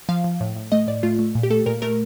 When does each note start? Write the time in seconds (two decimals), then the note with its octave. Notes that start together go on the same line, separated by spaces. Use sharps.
0.09 F3 F5
0.24 F3
0.40 A2
0.56 A2
0.72 A3 D#5
0.87 A2 D5
1.03 A3 F4
1.19 A3
1.35 A#2
1.43 G4
1.50 A3 A4
1.66 A#2 A#4
1.82 A3 A#4